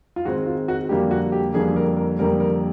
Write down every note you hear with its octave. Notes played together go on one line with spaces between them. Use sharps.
F4
G#2 D#3 G#3 C4 F#4
F4
F#4
F2 D3 G3 A#3 G4
F#4
G4
F2 D3 G3 A#3 G#4
A#4
A#4
F2 D3 G3 A#3 A#4
A#4